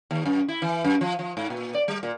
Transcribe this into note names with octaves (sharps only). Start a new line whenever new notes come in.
D#2
F#2
E4
E3
F#2
F3
F3
G#2
A#2
D5
G3
A#2